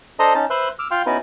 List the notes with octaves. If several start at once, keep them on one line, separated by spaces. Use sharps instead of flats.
D4 A4 C5 D#5 A#5
C#4 D#4 A5
B4 C5 E5 C6 F#6
D6 E6 F6
F4 F5 G5 C6 F6
B3 C#4 D#4 E4 F#4 B4